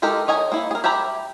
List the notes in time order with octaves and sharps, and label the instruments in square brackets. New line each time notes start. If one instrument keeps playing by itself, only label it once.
[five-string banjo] G#3 D#4 G4 A4 A#4
C#5 D#5 G#5 A#5
A#3 D#4 E4
G#4 A#4
G4 E5 G#5 A#5 B5